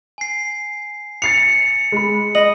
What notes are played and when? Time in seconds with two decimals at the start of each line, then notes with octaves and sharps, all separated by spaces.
0.18 G#5 C7
1.22 A6 C7 C#7 F7
1.92 G#3 B5
2.35 D#5 F#7